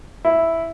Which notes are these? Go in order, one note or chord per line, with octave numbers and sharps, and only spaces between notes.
E4